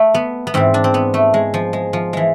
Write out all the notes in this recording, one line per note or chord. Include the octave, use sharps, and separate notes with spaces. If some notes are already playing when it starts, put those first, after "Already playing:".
Already playing: A3
B3
B3
G#2 E3 C4
D4
C4
B3
A3
G#3
F3
G#3
F3
E3 G#3